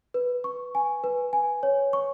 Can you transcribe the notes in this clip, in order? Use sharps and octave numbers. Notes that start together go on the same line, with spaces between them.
B4
C#6
G#5
B4
G#5
C#5
C#6